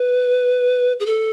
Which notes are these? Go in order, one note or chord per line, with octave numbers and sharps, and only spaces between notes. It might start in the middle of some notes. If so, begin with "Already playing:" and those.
Already playing: B4
G#4
A4